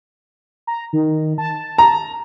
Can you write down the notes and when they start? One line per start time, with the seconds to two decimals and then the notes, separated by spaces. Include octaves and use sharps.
0.67 A#5
0.93 D#3
1.38 A5
1.78 A#5